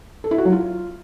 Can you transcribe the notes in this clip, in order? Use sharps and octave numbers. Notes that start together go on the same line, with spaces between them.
A4
E4
F#4
F#3
F4